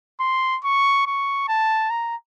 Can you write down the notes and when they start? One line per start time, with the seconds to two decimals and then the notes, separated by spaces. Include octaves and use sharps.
0.20 C6
0.64 C#6
1.06 C#6
1.48 A5
1.90 A#5